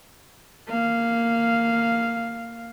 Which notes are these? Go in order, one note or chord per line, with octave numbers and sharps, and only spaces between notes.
A#3 F5